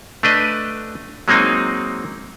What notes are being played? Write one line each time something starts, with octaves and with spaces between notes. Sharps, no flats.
A3 D4 B4 D#5
F#3 G#3 A#3 C4 D#4